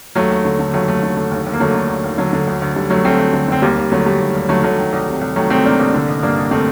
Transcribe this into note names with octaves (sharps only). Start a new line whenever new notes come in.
D#2 F#3 A3
D#2
D3
D3
D#2 F#3 A3
D#2 F#3 A3
D3
D3
D#2
D#2
A#3
D3 F#3 A3
D3
D#2
D#2
D3 F#3
D3
D2
D2
D3 G3
D3 F#3 A3
D2 A3 C4
D2
D3
D3 C4
D#2 G3 A#3
D#2
D3 F#3 A3
D3 G3
D#2
D#2
D3 F#3 A3
D3 F#3 A3
D#3
C2
C3
C2
D#3 F#3 A3
C2 A3 C4
C3 A#3 D4
C2
D3
A1
G2 A#3 D4
A1
D3 A3 C4